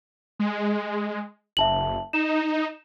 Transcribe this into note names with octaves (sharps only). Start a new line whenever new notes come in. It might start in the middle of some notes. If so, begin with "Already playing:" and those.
G#3
F#1 E5 A5 F#7
D#4 E7